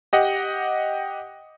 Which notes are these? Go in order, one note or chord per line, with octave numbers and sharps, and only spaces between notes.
G4 D#5 F#5